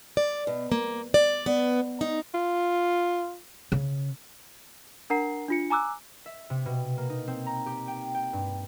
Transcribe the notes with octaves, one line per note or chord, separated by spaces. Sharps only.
D5
B2
A#3
D5
B3
D#4
F4
C#3
D4 A#4 F#5 A#5 C7
D4 F4 C#7
G#5 A#5 D6 E6 F#6
E5
C3
B2
A#3
D#4
C4
A#5
G4
G5
G5
G2